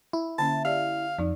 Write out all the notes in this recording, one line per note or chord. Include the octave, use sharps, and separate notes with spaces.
E4
D3 A#3 C#4 A5
G4 D5 F5
F2 D#4 D5